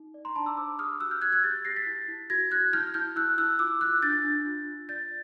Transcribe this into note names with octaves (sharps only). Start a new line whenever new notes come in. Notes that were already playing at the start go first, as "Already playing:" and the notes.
Already playing: D#4
D5
A#5 C6
D4 A5 B5
D6 E6
C5 D6 E6
G4 D#6 F6
F#4 E6 F#6
F6 G6
F#4 F#6 G#6
F#6 G#6
G4 G6 A6
G4 A#6 C7
A6 B6
E4
E4
F#4 G#6 A#6
F#4 F#6 G#6
E4 F6 G6
E4 F6 G6
E4 E6 F#6
E4 E6 F#6
F4 D6 E6
F4 E6 F#6
D4 G6 A6
D4
F4
F4
D5 G6 A6